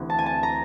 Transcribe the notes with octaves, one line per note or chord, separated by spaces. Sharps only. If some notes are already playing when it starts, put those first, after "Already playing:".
Already playing: D2 C3 E3
A5
G#5
A5
A#5